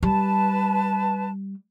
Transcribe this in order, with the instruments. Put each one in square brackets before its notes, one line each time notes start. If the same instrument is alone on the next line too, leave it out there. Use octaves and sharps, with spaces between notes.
[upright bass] G3 [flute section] B4 A5